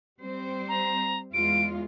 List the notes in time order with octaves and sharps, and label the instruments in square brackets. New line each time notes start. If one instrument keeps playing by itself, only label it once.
[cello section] G3 C4 C5
[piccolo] A#5
[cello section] E2 G#3 F4 [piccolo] D7